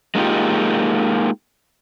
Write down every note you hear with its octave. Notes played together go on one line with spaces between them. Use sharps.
G#3 A#3 D#4 F4 G4